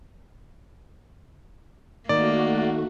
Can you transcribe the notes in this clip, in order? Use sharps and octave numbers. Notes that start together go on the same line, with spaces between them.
D#3 A3 A#3 F#4 D5